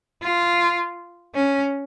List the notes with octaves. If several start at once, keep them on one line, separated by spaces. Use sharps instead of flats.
F4
C#4